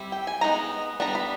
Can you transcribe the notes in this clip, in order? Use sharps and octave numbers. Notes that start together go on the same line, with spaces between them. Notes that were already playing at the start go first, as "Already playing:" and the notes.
Already playing: G3 C4 E4
G5
G#5
E3 G#3 B3 D#4 A#5
G3 B3 D4 A#5
B5